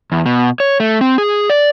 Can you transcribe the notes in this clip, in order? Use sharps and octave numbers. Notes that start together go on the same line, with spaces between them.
E2
B2
C#5
A3
C4
G#4
D5